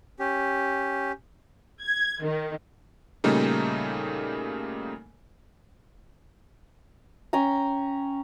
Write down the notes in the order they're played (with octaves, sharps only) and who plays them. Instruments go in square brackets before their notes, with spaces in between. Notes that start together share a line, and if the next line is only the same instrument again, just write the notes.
[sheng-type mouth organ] C#4 G4
[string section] G#6
D#3
[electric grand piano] A#2 C#3 G3 A3 A#3 D#4
[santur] C#4 G5 G#5 A#5